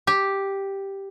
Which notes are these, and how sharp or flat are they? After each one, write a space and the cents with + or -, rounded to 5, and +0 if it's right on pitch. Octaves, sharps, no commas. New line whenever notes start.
G4 +0